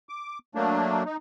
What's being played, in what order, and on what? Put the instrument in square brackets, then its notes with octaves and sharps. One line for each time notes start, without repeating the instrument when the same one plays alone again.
[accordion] D6
F#3 A3 A#3 D4
D#4